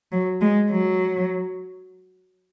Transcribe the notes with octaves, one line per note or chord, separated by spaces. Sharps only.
F#3
G#3
F#3